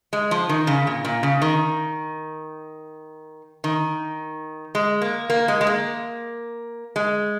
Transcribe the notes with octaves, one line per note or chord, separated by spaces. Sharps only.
G#3
F3
D#3
C#3
A#2
A#2
C#3
D#3
D#3
G#3
A#3
A#3
G#3
G#3
A#3
G#3